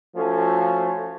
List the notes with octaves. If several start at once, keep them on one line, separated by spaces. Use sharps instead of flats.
F3 A3 C#4 F#4 A4